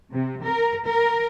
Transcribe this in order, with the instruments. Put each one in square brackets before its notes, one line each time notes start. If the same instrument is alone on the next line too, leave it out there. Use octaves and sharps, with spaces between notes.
[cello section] C3
A#4
A#4